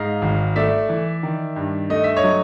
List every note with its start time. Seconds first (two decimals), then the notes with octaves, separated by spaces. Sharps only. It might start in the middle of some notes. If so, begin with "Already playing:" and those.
Already playing: G#2 D#5 F5
0.22 G#1
0.56 A3 D5 E5
0.89 E3
1.23 D#3
1.56 G2
1.90 A3 D#5
2.04 E5
2.16 C#5 D#5
2.24 F#3